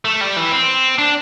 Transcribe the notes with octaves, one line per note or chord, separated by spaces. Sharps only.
A3
G3
E3
C4
D4